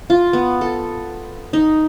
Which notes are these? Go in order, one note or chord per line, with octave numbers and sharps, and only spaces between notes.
F4
B3
A4
D#4